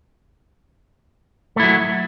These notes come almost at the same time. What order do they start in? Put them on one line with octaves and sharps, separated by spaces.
A3 E4 F#3